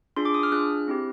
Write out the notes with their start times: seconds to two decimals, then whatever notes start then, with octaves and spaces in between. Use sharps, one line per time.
0.16 D4 F4 G#4 C6
0.25 D6
0.34 D#6
0.43 F6
0.52 D4 F4 G#4 F#6
0.88 C4 E4 G4